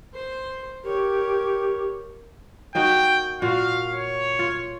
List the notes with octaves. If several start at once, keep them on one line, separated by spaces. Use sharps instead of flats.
C5 C6
G4 A#4 C#5
A#3 D#4 F#4 G5
A#2 F4 F#4 F5
C#5
F4